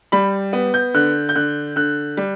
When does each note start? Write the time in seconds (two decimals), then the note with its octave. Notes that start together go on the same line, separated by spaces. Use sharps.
0.12 G3 B5
0.53 B3
0.74 G6
0.94 D3 F#6
1.29 G6
1.35 D3 F#6
1.76 D3 F#6
2.17 G3